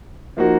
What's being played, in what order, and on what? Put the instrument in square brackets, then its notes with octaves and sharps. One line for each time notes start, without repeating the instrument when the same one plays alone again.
[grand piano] F3 A#3 D#4 F#4